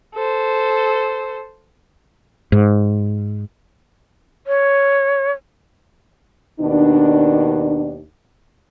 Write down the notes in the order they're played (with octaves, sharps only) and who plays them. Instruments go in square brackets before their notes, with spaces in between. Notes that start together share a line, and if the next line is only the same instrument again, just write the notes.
[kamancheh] A4 C5
[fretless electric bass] G#2
[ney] C#5
[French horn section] D#2 B2 D#3 D4